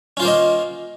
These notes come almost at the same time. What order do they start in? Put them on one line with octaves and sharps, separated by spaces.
C#4 F4 C5 A#3 D#5